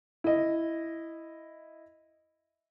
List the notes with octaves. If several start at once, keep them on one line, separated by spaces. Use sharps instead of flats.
E4 D#5